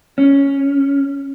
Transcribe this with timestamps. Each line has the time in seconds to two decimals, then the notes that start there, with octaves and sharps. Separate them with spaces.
0.18 C#4